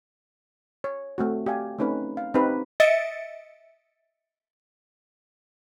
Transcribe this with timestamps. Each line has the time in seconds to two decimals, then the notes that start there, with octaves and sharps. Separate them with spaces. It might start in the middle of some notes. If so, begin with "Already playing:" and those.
0.84 C#5
1.18 A3 C4 F#4
1.46 G4 D5 F5 G#5
1.79 A3 C4 C#4 D#4 B4
2.17 F5
2.34 C4 D#4 G4 B4
2.80 D#5 E5 A6 C#7 D7